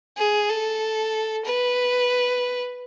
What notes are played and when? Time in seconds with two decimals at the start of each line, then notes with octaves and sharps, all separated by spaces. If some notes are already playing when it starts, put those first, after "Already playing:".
0.17 G#4
0.49 A4
1.45 B4